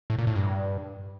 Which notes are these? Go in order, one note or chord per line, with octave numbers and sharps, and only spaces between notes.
A2
A#2
A2
G2